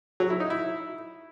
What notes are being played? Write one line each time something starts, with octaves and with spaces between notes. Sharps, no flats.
F#3
E4
D#4
E4